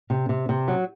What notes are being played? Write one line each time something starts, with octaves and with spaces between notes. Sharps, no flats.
C3
C3
C3
F#3